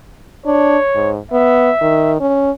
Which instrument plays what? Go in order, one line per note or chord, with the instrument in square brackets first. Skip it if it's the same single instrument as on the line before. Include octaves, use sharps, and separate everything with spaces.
[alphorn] D4 [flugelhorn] C#5
[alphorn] G#2
[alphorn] B3 [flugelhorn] E5
[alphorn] D#3
C#4